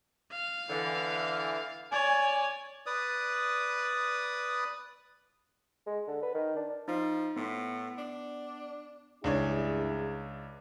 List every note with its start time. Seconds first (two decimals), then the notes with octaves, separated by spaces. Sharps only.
0.32 F5
0.70 D3 E3
1.92 C#5 D5 G#5
2.86 B4 D5 D#6
5.86 G#3
6.07 D3
6.22 B4
6.34 D#3
6.56 D4
6.88 F3 D#4
7.36 A2 B3
7.98 D4
9.24 C#2 G2 D4 E4 G#4 C#5